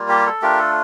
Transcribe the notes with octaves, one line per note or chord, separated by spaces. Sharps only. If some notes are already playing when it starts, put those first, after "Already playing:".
Already playing: G3 A#3 F4
G4
A4
A3 D4 F4 G4 A#4
A4